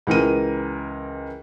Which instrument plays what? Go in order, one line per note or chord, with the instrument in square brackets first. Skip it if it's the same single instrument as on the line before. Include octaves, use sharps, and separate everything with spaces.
[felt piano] C#2 E3 A#4 D#7